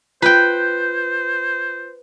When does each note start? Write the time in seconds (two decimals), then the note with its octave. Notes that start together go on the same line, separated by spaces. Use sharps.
0.22 F4 B4 C5 G5 G6